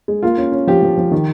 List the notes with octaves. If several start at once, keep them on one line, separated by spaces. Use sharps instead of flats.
G#3
A#3 F4
C#4
C#4
F3 G4
F3
F3
D#3